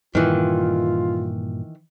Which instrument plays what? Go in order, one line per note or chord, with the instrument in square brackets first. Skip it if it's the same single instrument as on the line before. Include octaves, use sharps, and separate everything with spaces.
[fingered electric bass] G2 A#2 [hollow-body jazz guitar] D#3 E3 [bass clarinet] F4